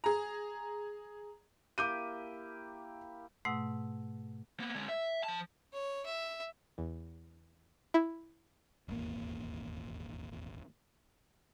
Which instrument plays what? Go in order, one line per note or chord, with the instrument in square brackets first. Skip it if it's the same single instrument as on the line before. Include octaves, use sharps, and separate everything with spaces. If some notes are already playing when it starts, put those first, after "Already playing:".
[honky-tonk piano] G#4 A#5
[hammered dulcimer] A#3 E4 G4 [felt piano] D6 G6 D#7
[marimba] G#2 B2 A3 F#5 E6
[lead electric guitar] A#3 B3
D3 G#3
E5
F3 A5
[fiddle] C#5
E5
[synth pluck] E2
E4
[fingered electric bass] D#1 G#1 E2 A#3